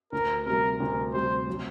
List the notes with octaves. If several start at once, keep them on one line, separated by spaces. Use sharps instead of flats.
D2 A#4
C3 G3 A#4
D2 A#4
C3 G3 C5
F#3